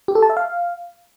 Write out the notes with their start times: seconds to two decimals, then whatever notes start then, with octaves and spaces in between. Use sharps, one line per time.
0.08 G4
0.15 A4
0.22 A5
0.30 E5
0.37 F5